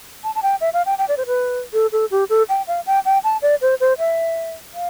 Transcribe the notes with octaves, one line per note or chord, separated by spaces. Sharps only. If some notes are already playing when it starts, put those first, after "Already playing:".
A5
A5
G5
E5
F5
G5
G5
D5
C5
B4
A4
A4
G4
A4
G5
F5
G5
G5
A5
D5
C5
C5
E5
F5